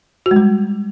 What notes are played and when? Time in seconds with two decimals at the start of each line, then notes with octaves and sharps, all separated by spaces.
0.26 F#4
0.31 G#3
0.36 G3